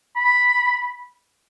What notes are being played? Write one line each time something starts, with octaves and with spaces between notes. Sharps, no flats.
B5